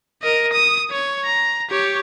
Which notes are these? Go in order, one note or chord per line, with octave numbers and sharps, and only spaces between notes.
A#4 D#5
D#6
C#5
A#5
G4 C#5